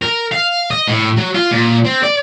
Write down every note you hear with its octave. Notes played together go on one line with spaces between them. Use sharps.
A#4
F5
D#5
A2
F#3
F4
A#2
C4
D5